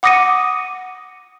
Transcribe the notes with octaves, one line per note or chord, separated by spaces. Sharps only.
F#5 D6 D#6 A#6 C#7 D#7